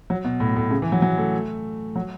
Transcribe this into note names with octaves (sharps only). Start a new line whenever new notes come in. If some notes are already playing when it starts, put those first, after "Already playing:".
F#3
B2
A2
A2
C#3
E3
F#3
F#3
A3
F#3